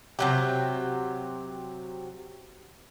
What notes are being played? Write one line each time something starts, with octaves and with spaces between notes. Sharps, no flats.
C3 F#3 G4